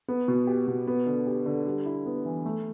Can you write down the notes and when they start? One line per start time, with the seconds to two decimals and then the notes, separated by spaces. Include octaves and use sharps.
0.08 B3
0.28 B2
0.47 G4
0.68 B2
0.87 B3
1.06 D3
1.27 G4
1.46 D3
1.66 G3
1.86 E4
2.06 B3
2.25 E3
2.45 A3